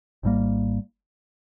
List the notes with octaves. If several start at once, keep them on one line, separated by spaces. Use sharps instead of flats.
G#1 G#2 G3 A#3